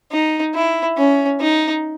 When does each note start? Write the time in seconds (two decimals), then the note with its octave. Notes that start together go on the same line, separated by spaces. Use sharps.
0.11 D#4
0.54 E4
0.97 C#4
1.40 D#4